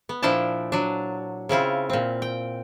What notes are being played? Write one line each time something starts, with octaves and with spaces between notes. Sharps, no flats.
B3
A#2 F3 D4 E4 G5 A5
F#3 D4
C#3 C4 E4 F4
A#2 C4
G5